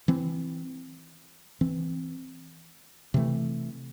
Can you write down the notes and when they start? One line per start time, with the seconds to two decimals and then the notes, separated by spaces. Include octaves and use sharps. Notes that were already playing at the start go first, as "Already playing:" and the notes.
0.08 E3 C4
1.61 E3 C4
3.14 C3 E3 A3